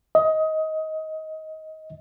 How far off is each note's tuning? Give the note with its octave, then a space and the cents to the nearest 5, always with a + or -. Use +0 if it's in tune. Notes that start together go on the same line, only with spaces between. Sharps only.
D#5 +20